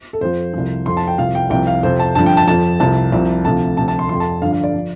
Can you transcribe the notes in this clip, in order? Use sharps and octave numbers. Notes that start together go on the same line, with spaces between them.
A4
F2 F3 C5
C2 C3 F3
F2 F3 C6
A5
G5
C2 C3 F3 F5
G5
C2 C3 F3 G5
F5
F2 C3 F3 C5
A5
G2 D3 F3 A5
G5
A5
F2 F3 A5
C2 C3 F3 A5
C2 C3 F3
D2 C3 F3 A5
D2 C3 F3 A5
A5
C6
F2 F3 C6
A5
G2 D3 F3 F5
F5
D5
F3